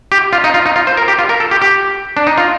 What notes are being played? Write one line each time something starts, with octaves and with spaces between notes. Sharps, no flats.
G4
F4
D#4
F4
D#4
F4
C5
A#4
G4
F4
A#4
A4
G4
G4
D4
D#4
F4